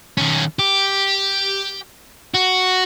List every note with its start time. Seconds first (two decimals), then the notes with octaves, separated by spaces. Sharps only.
0.18 D#3 C#4
0.59 G4
2.34 F#4